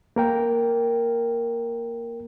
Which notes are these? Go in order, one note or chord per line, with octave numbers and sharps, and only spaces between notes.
A#3 A#4 G5